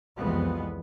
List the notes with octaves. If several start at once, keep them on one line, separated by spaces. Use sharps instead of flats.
C2 F2 E3 F3 G#3 B3